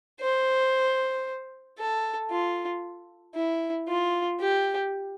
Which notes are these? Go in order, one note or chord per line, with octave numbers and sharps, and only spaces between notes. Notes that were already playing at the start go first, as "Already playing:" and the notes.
C5
A4
F4
E4
F4
G4